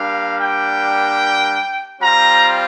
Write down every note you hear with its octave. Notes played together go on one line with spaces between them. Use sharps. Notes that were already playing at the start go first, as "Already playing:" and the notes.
Already playing: G3 A#3 D4 F5
G5
G3 C4 F4 A#5